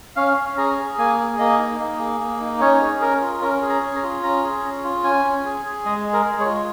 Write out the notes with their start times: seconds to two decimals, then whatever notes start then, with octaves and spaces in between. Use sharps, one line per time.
0.16 C#4 F5
0.37 C#4
0.57 G#4 A#5
0.78 G#4
0.98 A#3 G#5
1.19 G#4
1.39 A#3 D#5
1.59 D#4
1.80 A#3
1.99 G#4
2.20 A#3
2.41 D#4
2.61 C#4 C#5
2.81 G#4
3.01 C#4 A#4
3.21 F4
3.41 C#4 A#4
3.62 G#4
3.69 A#5
3.82 C#4
3.96 A#5
4.03 F4
4.23 C#4 A#5
4.43 G#4
4.64 C#4
4.84 F4
5.04 C#4 G#5
5.25 C#4
5.45 G#4
5.65 G#4
5.85 G#3 D#5
6.06 G#4
6.13 A#4
6.26 G#3
6.40 C#5
6.46 F4